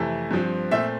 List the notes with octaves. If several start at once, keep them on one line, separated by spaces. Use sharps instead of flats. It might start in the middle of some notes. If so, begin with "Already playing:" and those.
Already playing: F2 C3 E3 A3
G2 F3 C4
A#2 A3 C4 E5